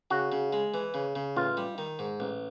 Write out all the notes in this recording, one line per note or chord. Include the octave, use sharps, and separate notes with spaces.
C#3 F#4
C#3
G#3
E3
C#3
C#3
A1 F4
G3
D#3
G#2
A1